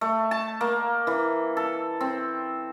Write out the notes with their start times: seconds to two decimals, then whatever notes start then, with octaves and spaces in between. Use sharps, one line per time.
0.01 A3
0.31 A5
0.61 A#3
1.07 E3
1.57 A4
2.00 C4